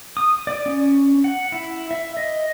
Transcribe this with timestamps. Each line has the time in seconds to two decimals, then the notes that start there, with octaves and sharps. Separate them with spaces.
0.17 D#6
0.47 D5
0.66 C#4
1.24 F#5
1.52 E4
1.91 E5
2.17 D#5